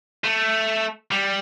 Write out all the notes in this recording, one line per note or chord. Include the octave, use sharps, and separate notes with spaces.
A3
G3